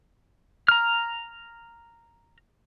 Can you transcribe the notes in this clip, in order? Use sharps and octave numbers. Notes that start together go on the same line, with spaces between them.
A#5 F6